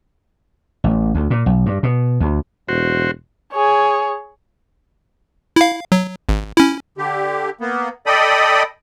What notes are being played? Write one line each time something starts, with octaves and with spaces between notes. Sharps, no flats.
A1
D2
A#2
B1
G2
B2
D2
E1 F#4 C5
G#4 C#5
E4 F5
F#3
G#1
C#4 E4
D3 G4
A#3 B3
A4 D5 D#5 G5 B5 D#6